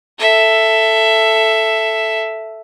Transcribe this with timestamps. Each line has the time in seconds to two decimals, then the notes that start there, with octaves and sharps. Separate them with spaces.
0.19 A4 E5